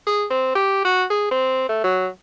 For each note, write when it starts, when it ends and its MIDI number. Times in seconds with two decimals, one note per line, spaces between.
0.07 0.25 68
0.30 0.54 60
0.55 0.81 67
0.85 1.04 66
1.10 1.29 68
1.31 1.68 60
1.69 1.81 57
1.84 2.07 54